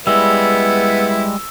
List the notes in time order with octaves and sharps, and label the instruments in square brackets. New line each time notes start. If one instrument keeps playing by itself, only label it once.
[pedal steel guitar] G3 G#3 [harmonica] B3 E4 [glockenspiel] E6